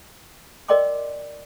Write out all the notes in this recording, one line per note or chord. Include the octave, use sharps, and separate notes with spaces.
A#4 D5 D#5 G5 C6 D6